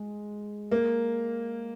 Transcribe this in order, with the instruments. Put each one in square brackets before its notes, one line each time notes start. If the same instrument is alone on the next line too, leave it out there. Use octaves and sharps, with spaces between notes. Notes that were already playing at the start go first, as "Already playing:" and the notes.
Already playing: [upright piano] G#3
[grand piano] A#3